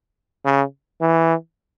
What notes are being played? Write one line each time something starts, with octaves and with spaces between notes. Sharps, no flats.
C#3
E3